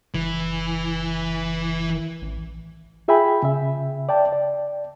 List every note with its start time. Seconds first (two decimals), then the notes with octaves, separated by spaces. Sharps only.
0.15 F#1 E3
2.22 A1
3.08 F4 G#4 E5 G5 G#5 B5
3.43 C#3 E5
4.09 D5 G5 A5
4.33 D5